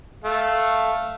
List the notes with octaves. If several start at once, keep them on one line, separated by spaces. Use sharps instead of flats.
A3 F5